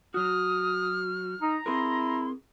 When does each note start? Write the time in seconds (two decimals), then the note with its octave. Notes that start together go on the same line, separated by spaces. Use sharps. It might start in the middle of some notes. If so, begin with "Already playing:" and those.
0.14 F#3 F#4 D#6 F6
1.41 D#4 A#5
1.66 C4 E4 G#4 A#4 C6